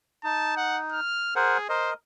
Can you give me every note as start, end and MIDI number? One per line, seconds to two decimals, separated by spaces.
0.24 1.00 63
0.24 0.57 81
0.57 0.80 78
0.92 1.32 89
1.36 1.66 68
1.36 1.58 70
1.36 1.58 72
1.36 1.58 78
1.69 1.94 70
1.69 1.91 72
1.69 1.94 75